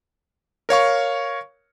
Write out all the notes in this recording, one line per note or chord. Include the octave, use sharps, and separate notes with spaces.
A#4 C#5 F5 C#6